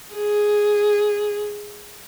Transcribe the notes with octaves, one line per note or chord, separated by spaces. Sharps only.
G#4